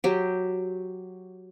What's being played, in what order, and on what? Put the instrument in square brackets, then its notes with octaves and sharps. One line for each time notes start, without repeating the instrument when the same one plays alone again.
[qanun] F#3 G4